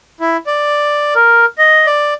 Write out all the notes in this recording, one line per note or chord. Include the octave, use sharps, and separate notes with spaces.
E4
D5
A#4
D#5
D5